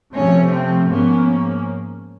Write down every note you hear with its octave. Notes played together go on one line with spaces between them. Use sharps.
C3 F3 A3 C#4
C4
G#2 F3 A#3 B3 C#4